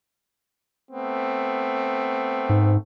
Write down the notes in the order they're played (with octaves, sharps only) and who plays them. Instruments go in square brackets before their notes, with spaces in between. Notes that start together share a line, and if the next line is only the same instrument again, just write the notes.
[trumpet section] A3 B3 C4
[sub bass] G#2